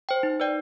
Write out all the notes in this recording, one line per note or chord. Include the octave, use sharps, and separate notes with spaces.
C5 G5
D#4
B4 D5 G5